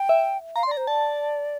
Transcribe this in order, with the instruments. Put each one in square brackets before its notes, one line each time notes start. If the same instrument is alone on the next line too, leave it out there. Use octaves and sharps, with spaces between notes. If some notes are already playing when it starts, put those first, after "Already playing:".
Already playing: [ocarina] G5
[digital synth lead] E5
[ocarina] F5 [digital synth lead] A#5
[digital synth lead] C6
[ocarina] D5
[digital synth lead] A#5
[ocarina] C5
[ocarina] D5 [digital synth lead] A5